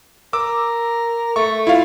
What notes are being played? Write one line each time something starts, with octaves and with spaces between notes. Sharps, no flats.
A#4 D6 E6
A3 C#6
E4 F4 F5